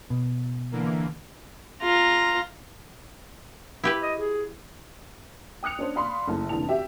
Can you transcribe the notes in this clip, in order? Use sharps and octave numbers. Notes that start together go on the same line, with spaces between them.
B2
D3 E3 A#3
F4 A#5
E4 G4 B4
D#5
G#4
G5 D#6 F#6 C#7 F7
C#4 D4 C5
D5 F5 B5 C6
F#1 A3 E4 A5
F1 D3 E3 A5 F7
F#4 G4 E5 G5